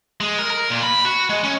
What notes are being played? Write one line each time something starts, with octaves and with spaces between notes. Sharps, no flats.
G#3
A#4
A#4
A#2
B5
F#4
G#3
C#4